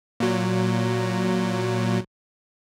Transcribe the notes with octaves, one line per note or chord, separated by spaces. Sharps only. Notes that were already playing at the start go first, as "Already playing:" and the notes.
A#2 F#3